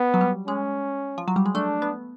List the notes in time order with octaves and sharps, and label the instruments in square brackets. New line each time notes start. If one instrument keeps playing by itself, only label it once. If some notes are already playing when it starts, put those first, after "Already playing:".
Already playing: [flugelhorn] B3
[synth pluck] F#3
G3
[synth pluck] G#3 [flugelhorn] C#4
[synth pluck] F3
F#3
G3
G#3
[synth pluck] A3 [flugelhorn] D4
[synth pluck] B3